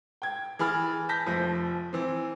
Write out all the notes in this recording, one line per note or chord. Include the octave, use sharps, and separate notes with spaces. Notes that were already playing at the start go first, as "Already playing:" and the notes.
G5 G#6
E3 G#4 B5 F6 A6
A5 G6 A#6 B6
F1 F3
E3 C4